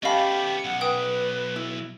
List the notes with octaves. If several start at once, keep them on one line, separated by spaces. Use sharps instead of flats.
A3 B3 C#4 G4 D#5 F5 A5 B5
B1 F#5
B4 F#5 G5 D#6
E4